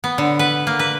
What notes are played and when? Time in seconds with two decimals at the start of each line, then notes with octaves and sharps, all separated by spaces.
0.04 B3
0.18 D3
0.39 B4
0.67 A#3
0.79 B4